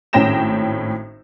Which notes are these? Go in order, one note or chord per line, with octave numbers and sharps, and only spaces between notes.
G#1 A2 C#4 G5 A#6 E7